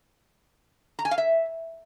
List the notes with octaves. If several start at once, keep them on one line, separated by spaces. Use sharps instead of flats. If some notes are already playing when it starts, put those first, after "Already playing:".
A#5
G#5
F5
E5